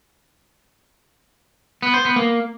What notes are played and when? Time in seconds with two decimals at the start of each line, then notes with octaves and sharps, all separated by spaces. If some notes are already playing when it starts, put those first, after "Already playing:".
1.83 B3
1.94 C5
2.05 B3
2.16 A#3